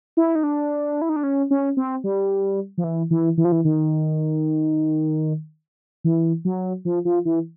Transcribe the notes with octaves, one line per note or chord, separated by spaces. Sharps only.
E4
D#4
D4
E4
D#4
D4
C#4
C#4
C4
G3
F3
E3
E3
E3
F3
E3
D#3
E3
F#3
F3
F3
E3